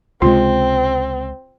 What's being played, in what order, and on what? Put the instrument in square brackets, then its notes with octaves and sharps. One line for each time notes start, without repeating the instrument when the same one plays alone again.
[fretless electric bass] C#2 C3 G#3 [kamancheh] C4 [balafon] F4